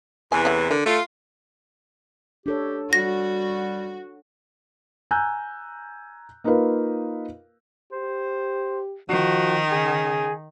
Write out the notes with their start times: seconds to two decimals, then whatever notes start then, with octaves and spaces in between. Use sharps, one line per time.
0.32 E2 C3 E3 G#5
0.45 A3 C#4 F#5
0.71 D3 A#4
0.85 A3 F4
2.46 D4 G4 A4 C#5
2.93 G3 F#4 A#6
5.11 G#5 A#5 E6 F#6 G6
6.44 A#3 D#4 F4 A#4 B4 F5
7.92 G4 C5
9.09 D#3 F3 F#4
9.71 C#3 G#4